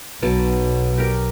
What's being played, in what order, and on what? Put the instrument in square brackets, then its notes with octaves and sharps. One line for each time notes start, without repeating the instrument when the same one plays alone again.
[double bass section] B1 [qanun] B2 F#3 A5
[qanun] G4 A#4